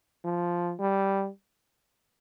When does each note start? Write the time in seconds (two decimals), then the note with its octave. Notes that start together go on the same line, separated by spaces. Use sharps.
0.24 F3
0.79 G3